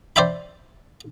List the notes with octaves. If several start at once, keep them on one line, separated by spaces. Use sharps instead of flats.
C5 D5 E5 G5 B5